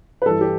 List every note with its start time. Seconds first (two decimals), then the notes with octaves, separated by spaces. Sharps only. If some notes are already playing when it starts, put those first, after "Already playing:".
0.22 B4
0.26 G2 E3 G3 A4
0.41 G4